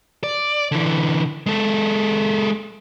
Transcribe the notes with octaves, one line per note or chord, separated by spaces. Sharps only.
D5
D3 E3
G#3 A4